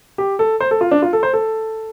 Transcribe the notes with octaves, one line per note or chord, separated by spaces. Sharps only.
G4
A4
C5
A4
F4
D4
F4
A4
C5
A4